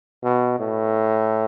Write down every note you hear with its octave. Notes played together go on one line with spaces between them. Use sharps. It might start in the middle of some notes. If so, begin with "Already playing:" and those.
B2
A2